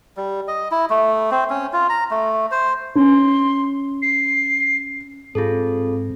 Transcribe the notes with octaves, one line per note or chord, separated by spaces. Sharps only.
G3
D#5
E4
A3
C4
C#4
F4
A#5
A3
C5
C#4 C6
C7
G#2 C4 F4 G#4 A4